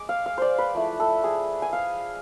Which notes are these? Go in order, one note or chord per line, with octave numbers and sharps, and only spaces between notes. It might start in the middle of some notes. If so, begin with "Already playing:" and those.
Already playing: G#3 D6
F5
F5
C5 D5
B4
F3 A3 E4
A4
G#4
G#5
F5